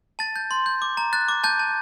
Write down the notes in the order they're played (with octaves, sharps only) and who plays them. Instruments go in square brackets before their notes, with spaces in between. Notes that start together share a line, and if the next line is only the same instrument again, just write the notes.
[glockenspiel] A5 A6
G6
C6
G6
D6
A#5
F#6 A6
D6
A5 G6
A5